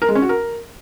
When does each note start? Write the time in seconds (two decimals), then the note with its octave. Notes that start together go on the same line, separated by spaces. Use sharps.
0.02 A#4
0.09 G#3
0.15 C#4
0.22 F#4
0.29 A#4